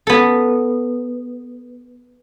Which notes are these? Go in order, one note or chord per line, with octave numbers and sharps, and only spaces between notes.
B3 A4